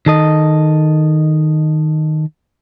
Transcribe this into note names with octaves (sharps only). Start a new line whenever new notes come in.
D#3 A4 D#5